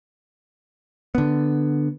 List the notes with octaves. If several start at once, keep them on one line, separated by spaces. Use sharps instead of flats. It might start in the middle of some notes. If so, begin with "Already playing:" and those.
D3 B3